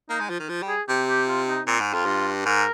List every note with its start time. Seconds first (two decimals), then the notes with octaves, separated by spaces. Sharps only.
0.10 A#3 D#4
0.20 G#3
0.30 F3
0.40 D#3
0.49 F3
0.62 G3
0.68 G#4
0.88 C3 G4
1.09 G4
1.28 F4
1.48 D#4
1.67 A#2 C4
1.80 G#2
1.93 F2 F4
2.06 G2
2.45 G#2 A#4